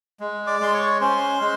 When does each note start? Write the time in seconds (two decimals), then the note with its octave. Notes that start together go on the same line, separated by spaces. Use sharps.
0.20 G#3
0.47 D5 D6
0.60 G#3 C6
0.74 C#5 C#6
1.01 C#4 C5 C6
1.41 G#3